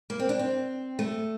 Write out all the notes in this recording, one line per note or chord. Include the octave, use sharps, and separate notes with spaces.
A#3
C4
D4
C4
A3